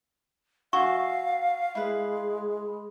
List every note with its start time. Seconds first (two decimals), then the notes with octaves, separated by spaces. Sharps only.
0.73 F#4 E5 F5 G#5 C#6
1.75 G#3 E4 B4